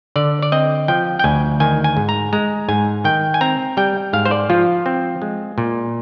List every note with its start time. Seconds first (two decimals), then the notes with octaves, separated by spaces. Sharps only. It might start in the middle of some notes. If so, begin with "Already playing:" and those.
0.16 D3 D5
0.43 D5
0.52 C4 D#5
0.88 F3 G5
1.19 G5
1.24 D2 G#5
1.60 D#3 G#5
1.84 G#5
1.97 G#2
2.09 A#5
2.33 G#3 A#5
2.69 G#2 G#5
3.04 D#3 G5
3.34 G#5
3.41 C4 A#5
3.77 G3 G5
4.13 G#2 F5
4.25 C5
4.31 D5
4.50 F3 F4
4.86 C4
5.22 G#3
5.58 A#2